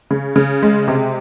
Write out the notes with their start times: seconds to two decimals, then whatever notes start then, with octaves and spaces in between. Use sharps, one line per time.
0.11 C#3
0.36 C#3
0.62 G#3
0.88 C3